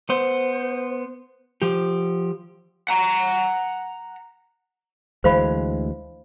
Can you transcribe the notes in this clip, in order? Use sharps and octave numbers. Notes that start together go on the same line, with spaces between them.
B3 C5
F3 G4
F#5 A#5
D2 E3 G#3 C5 F5 B5